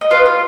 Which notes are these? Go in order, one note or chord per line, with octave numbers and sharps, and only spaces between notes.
D#5
F4 B4 F5
F4 F5